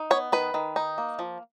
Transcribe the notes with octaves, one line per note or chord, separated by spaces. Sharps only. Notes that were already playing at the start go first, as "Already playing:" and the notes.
Already playing: D#4
B3 C#5
D#3 B4
D#3
D#4
A#3
F3